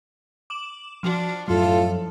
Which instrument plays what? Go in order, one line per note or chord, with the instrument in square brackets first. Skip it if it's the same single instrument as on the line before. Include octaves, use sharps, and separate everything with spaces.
[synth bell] D6 E7 F#7
[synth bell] F3 F#4 [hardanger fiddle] D4
[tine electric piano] F#2 F#3 [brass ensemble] A2 F4 [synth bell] F3 [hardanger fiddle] A4